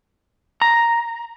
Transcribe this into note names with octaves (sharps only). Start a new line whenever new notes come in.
A#5